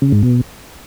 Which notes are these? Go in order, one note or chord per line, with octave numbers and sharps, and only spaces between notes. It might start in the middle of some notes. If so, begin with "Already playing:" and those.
C#3
G#2
B2